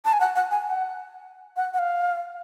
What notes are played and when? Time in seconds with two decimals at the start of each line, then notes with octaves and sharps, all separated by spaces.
0.05 A5
0.13 G#5
0.20 F#5
0.36 F#5
0.51 G#5
0.66 F#5
1.56 F#5
1.74 F#5
1.79 F5